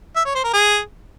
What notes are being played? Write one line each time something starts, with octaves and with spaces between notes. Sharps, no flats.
E5
C#5
C5
A#4
G#4